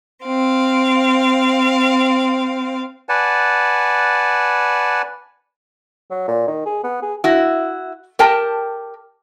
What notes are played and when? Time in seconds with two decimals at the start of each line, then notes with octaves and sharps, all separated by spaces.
0.24 C4 F5
3.09 B4 D5 F#5 G#5 A5
6.11 F#3
6.27 A#2
6.47 D#3
6.66 G#4
6.83 B3
7.02 G#4
7.24 E4 F#4
8.19 G4 A#4 G5 A5